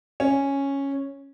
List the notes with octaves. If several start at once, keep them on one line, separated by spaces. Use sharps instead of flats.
C#4